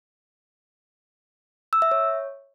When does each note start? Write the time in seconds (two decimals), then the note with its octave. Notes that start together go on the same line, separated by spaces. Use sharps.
1.73 E6
1.82 E5
1.91 C#5